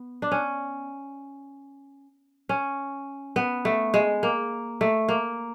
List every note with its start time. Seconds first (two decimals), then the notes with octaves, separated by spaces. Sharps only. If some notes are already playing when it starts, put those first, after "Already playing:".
Already playing: B3
0.22 D4
0.31 C#4
2.49 C#4
3.36 B3
3.65 A3
3.94 G#3
4.23 A#3
4.81 A3
5.08 A#3